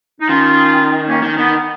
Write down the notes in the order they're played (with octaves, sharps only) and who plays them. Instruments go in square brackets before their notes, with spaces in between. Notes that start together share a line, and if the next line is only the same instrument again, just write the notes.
[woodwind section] D#4
[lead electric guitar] D#3 [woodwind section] C#4 F4
[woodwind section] A#3 C#4
[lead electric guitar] D#3
[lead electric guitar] D#3 [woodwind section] B3